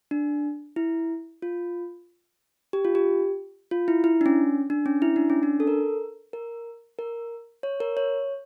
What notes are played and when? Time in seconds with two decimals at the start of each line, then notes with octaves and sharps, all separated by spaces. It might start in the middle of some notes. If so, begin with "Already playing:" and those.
0.11 D4
0.76 E4
1.42 F4
2.73 G4
2.85 F4
2.95 G4
3.71 F4
3.88 E4
4.04 E4
4.21 D4
4.26 C#4
4.70 D4
4.86 C#4
5.02 E4
5.16 D4
5.30 C#4
5.43 D4
5.60 A4
5.67 A#4
6.33 A#4
6.99 A#4
7.63 C#5
7.80 A#4
7.97 C#5